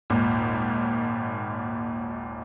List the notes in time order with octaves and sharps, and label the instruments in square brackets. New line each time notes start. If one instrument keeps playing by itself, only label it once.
[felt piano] G#1 D#2 A#2